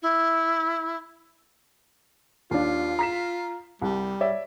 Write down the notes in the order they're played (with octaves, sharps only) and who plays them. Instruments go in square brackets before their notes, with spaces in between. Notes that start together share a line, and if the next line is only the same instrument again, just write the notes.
[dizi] E4
[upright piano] D#2 D4 [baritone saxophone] F4
[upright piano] A#5 B6 E7
[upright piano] C2 [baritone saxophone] G3
[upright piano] C#5 D5 E5